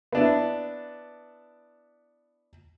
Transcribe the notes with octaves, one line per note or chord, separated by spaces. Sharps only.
B3 D4 E4